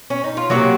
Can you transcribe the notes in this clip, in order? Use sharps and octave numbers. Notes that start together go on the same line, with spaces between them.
C#4
D#4
F4
C3 D#3 F#3 A#3 F#4